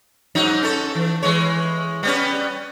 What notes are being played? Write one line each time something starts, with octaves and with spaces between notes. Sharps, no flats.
G#2 F#3 D#4
C#4 A4
E3
E3 G#3 C#5
G3 B3 C#4